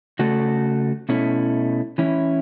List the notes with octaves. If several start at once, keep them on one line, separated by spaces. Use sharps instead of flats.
C#3 A3 F#4 A4
B2 A3 C#4 E4
E3 C#4 E4